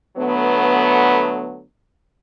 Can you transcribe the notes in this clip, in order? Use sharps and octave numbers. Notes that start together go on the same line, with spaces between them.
D3 F#3 A3 B3